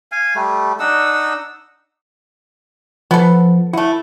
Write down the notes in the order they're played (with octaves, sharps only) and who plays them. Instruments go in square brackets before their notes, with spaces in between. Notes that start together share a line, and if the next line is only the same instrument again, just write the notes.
[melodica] F5 G#5
G3 A3
D4 D#4 F#5 E6
[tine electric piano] F3 [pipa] B3 A4
[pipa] A3 F#5 [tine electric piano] E4